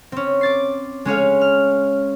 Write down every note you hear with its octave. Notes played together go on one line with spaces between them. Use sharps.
C4 C#4
D6 A6 C7
G#3 C#4 C#5 F5
F6